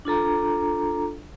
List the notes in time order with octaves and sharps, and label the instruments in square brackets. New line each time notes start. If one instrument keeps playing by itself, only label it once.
[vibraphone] D4 F4 A4 A#5